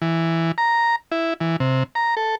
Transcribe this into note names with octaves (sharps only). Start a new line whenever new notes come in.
E3
A#5
E4
E3
C3
A#5
A4